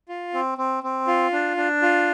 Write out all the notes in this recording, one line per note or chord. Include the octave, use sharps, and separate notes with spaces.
F4
C4
C4
C4
F4
D4
D4
F4